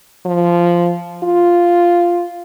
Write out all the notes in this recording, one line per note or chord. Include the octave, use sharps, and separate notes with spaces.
F3
F4